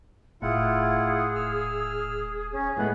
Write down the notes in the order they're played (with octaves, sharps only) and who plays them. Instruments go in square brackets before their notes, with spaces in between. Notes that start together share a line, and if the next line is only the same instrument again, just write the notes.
[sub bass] E1 [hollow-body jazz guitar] A2 [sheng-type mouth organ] E4 F4 F#5 [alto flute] G#4
[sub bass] D#1 [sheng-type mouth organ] E6 F6
[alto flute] C#4 [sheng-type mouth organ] G#4
[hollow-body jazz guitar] A2 G#3 A3 [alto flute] B3